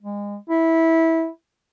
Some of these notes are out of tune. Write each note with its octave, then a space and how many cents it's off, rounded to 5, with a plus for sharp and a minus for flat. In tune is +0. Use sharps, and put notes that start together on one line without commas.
G#3 -30
E4 -15